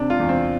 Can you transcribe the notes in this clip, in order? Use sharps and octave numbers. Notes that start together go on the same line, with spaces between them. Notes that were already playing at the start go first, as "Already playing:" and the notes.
Already playing: C3 D4
F4
E2
C4